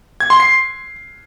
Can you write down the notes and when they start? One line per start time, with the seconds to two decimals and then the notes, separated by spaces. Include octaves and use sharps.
0.20 G#6
0.30 C6
0.40 C7